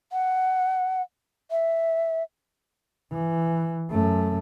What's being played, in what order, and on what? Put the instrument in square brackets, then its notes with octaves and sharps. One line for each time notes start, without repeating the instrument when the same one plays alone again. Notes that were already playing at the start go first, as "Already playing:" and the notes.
[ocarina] F#5
E5
[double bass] E3
F#2 A3